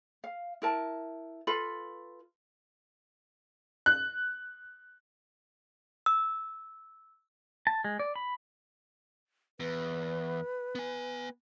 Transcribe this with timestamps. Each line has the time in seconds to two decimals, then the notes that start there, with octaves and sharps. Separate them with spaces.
0.24 F5
0.62 E4 A#4 A5
1.47 F4 A4 B4 B5
3.86 F#6
6.06 E6
7.67 A5
7.84 G#3
7.99 D5
8.16 B5
9.60 E2 B4
10.75 B3 G#5